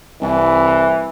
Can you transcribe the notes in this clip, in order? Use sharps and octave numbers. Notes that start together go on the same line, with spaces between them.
C2 E3